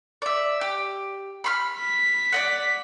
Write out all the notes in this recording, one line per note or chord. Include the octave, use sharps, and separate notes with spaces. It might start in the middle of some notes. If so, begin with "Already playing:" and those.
D5 E5
G4
B5 C6 F6
B6
D5 D#5 F#5